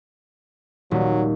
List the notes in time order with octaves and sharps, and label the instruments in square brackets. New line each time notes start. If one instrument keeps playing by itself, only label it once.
[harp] D#1 [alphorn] F#3